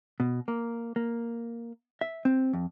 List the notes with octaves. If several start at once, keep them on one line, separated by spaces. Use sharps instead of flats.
B2
A#3
A#3
E5
C4
F2